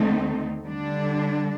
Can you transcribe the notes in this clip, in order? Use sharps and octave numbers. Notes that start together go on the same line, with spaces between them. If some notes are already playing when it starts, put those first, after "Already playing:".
Already playing: D#2 D3 A3 C4 D#4
D3 G3 D4